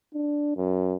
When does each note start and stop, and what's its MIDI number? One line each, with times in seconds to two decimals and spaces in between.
0.14 0.52 62
0.57 0.95 42